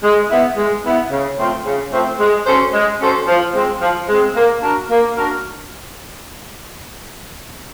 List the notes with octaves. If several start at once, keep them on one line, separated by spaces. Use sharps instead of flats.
G#3
B3 E4
G#3
B3 E4
C#3
F3 A3 C4
C#3
F3 A3 C4
G#3
C#4 F#4 A4 C5
G#3
C#4 F#4 A4 C5
F3
G#3 C4
F3
G#3 C4
A#3
D4 F#4 A#4
A#3
D4 F#4 A#4